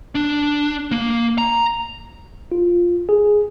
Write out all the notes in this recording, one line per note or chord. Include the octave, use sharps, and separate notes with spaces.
D4
A#3
A#5
F4
G#4